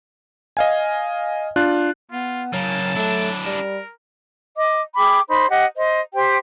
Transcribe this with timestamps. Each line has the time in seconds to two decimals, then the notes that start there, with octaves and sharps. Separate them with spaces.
0.57 D#5 F5 G#5
1.56 D4 F4 F#6
2.11 B3 F4
2.53 C#3 F#3 A#3 A5
2.96 A3 D4 E4
3.45 G3 A#4
4.56 D#5 D6
4.96 G#4 G5 B5 D6
5.28 D#4 C5 B5
5.49 G4 D#5 F#5
5.76 C5 D#5
6.14 G4 C5 G5